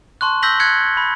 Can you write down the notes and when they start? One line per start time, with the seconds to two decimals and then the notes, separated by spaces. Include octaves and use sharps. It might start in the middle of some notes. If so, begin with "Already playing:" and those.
0.21 A5 C6 C#6 F#6
0.42 E6 G6 A#6 B6 F#7 G7
0.60 F#6 G#6 B6 C#7
0.97 B5